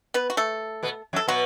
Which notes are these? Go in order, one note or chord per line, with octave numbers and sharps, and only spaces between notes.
B3 B4
F#4
A3 A4
B2 B3
F#2 F#3
A4
B2 F#3 B3 F#4